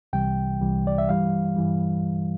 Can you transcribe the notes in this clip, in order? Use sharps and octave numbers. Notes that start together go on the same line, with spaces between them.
C2 C3 E3 G3 G5
C2 C3 E3 G3
D5
E5
G2 E3 G3 F5
G2 E3 G3